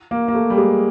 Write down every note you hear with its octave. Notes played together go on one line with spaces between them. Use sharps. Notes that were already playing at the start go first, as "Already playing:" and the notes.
A#3
A#3
A3
G3
G#3